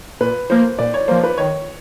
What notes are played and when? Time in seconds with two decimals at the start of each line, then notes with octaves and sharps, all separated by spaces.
0.20 A#2 B4
0.50 F3 A#3 C5
0.79 A#2 D5
0.94 C#5
1.08 F3 A#3 C5
1.23 B4
1.38 D#3 C#5